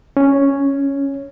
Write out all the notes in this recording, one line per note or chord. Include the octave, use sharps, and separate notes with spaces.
C#4